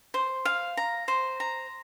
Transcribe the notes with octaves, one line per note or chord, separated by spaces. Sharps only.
C5
F5
A#5
C5
A#5